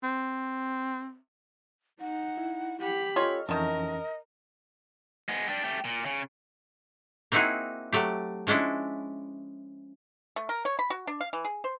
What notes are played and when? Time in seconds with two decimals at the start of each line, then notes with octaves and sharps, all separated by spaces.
0.03 C4
2.01 D#4 F#5
2.38 E4
2.80 G4 F#5 B5
3.16 C#4 F4 A4 C#5 D#5 F6
3.49 F2 D#3 E3 A3 C#4 A#4 D#5
5.29 G#3 B3
5.49 G3 D4
5.63 A3 G4
5.85 A#2
6.06 C#3
7.32 A#3 C4 D#4 E4 F#4 G#4
7.92 F#3 A3 G4
8.47 F3 G#3 C#4 D4 E4
10.36 A3
10.49 A#4
10.65 C#5
10.79 B5
10.90 F#4
11.07 D4
11.21 F5
11.33 E3
11.45 G#4
11.64 C5